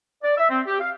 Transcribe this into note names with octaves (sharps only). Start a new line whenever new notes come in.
D5
E5
C4
G4
F5